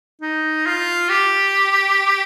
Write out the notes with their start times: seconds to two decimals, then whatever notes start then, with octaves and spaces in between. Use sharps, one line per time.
0.21 D#4
0.66 F4
1.09 G4